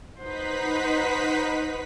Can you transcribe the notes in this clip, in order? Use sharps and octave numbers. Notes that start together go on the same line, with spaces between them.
D#4 B4 C5 F#5 B6